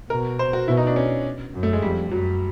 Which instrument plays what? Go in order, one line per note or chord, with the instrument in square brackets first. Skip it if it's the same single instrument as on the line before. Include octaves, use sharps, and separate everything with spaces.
[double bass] B2 [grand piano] A#4
[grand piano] C5
F#4
[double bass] B2 [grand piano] E4
[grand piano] D#4
D4
C#4
[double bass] F#2
[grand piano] A3
G#3
[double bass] F2 [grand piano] G3
[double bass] F#2 [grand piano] F#3